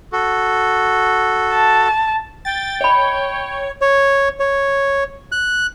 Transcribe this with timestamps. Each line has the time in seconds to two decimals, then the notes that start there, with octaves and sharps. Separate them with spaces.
0.13 F#4 A4
1.53 A5
2.45 G5 A6
2.81 C#5 D#5 B5
3.81 C#5
4.40 C#5
5.32 F#6